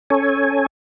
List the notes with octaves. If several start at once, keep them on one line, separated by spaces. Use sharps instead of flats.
C#4 A4 C#5 G#5